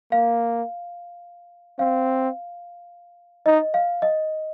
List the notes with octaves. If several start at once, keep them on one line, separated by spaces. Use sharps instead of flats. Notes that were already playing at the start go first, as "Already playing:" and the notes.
A#3 F5
C4 F5
D#4 D#5
F5
D#5